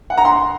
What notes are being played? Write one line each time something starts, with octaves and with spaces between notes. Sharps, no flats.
F#5
A#5
C6